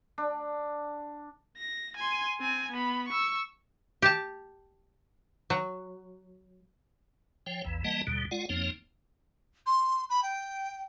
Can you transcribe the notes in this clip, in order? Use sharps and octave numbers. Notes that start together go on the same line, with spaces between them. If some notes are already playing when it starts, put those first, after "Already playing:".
D4
A#6
G#5 C6
C4 G#5
B3 B5
C#6 E6
G4 A5
F#3
F3 C#5 G5
A#1 E2 E3
E3 G3 A#3 D#5 F#5 A5
D#2 B2 D3 G3
G#3 F4 D5 F#5
F2 F3 A#3 C4 D#4 C#5
C6
B5
G5